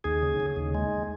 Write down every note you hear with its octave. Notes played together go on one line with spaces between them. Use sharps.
D#2 G#4
C#3
C#3
D#2
G#3